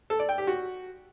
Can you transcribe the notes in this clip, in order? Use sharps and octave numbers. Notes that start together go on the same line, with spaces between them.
A4
D5
G5
G4
F#4